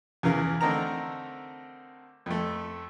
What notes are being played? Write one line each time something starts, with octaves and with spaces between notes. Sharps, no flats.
E2 C#3 E3 A#4 F5
D3 A3 C4 D#4 A#4 A#5
F2 A3